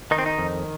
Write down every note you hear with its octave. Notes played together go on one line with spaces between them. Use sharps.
D#3 D#4
C4
D#4
F2